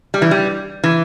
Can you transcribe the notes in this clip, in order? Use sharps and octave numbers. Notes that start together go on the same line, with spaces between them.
G3
E3
G3
E3